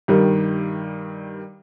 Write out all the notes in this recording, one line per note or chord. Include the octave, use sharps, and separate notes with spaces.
G2 D#3 G3